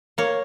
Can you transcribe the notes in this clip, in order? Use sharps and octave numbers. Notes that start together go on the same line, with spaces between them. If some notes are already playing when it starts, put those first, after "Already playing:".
A#3 C#5